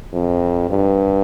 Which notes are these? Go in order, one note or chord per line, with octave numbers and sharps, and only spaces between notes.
F2
G2